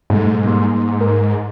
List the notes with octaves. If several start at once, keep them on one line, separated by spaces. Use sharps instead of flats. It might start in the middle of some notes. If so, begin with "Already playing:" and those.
G#2 B2 G3 A3
G3 A#3 C6
A#4